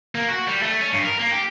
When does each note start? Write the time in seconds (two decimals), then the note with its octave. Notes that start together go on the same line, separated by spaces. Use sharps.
0.15 A#3
0.28 F#4
0.47 G3
0.62 A3
0.81 C#4
0.93 G2
1.05 A#4
1.20 A#3
1.32 G4